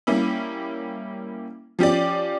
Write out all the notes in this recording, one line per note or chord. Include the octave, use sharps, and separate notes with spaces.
G3 A#3 C#4 E4
F3 C#4 G4 D5